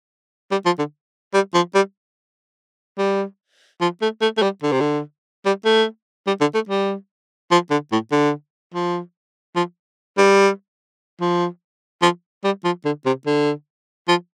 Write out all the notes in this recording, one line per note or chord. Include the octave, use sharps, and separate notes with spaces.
G3
F3
D3
G3
F3
G3
G3
F3
A3
A3
A3
G3
D3
C3
D3
G3
A3
G3
D3
A3
G3
F3
D3
A2
D3
F3
F3
G3
F3
F3
G3
F3
D3
C3
D3
F3